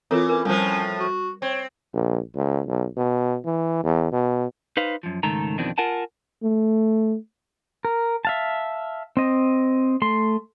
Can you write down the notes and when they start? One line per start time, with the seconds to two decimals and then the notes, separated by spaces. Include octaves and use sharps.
0.11 E3 C4 F4 A4 A#4 C#5
0.29 C#4 A#4 B4
0.45 A2 F3 G3 C#4
1.00 F#4
1.42 C4 C#5
1.93 A#1
2.35 C#2
2.67 B1
2.97 B2
3.45 E3
3.83 E2
4.12 B2
4.77 D#4 B4 C5 F5
5.03 F#2 F3
5.23 C#2 G#2 D#3 A3 A4 A#5
5.58 F2 B2 D#3 E3 C4 D4
5.78 F4 A#4 F#5 G#5 A5
6.43 A3
7.85 A#4
8.25 E5 F5 A5
9.17 C4 D#5
10.02 A3 C6